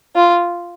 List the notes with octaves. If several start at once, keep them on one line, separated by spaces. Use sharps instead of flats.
F4